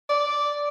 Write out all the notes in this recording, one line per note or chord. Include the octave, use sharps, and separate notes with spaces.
D5